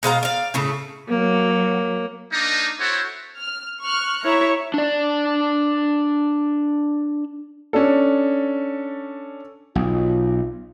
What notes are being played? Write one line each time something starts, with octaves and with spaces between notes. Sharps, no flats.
B2 G#3 F5 A#5
D5 F5
A2 C#3 A3
F#3 A#3
A#3 D4 D#4
C4 E4 F#4 A4 C5 C#5
F6
C#6 F6 F#6
E4 C#5 E5 A#5
D4 D5
C#4 D4 A4
B1 F4